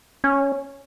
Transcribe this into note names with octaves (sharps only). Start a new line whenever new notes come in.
C#4